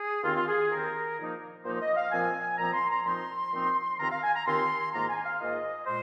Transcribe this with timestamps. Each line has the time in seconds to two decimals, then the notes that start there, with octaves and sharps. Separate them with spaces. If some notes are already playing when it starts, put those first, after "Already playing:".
Already playing: G#4
0.23 D#2 D#3 C4 F4
0.36 F4
0.47 G#4
0.71 D#2 D#3 C4 A#4
1.18 A#2 F3 A#3 D#4
1.64 A#2 F3 A#3 D#4 C5
1.75 C5
1.80 D#5
1.96 F5
2.11 A#2 F3 C4 G#5
2.58 A#2 F3 C4 A#5
2.73 C6
2.89 A#5
3.05 A#2 F3 C4 D#4 C6
3.52 A#2 F3 C4 D#4
3.99 D#2 D#3 C4 F4 A#5
4.11 F5
4.23 G#5
4.35 A#5
4.46 D#2 D#3 C4 F4 C6
4.92 G#2 D#3 A#3 F4 A#5
5.09 G#5
5.24 F5
5.39 G#2 D#3 A#3 F4 D#5
5.86 A#2 G#3 C5